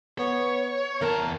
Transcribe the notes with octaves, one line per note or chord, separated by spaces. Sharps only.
B3 C#5
E2 A#4 A5